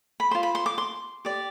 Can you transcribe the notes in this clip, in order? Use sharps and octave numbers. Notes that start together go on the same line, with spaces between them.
B5
F4 C5 C6
B5
C6
D6
C6
G4 D5